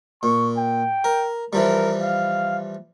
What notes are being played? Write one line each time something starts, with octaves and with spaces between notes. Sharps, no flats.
A#2 C#6
G5
A#4
E3 F3 G3 A#4
F5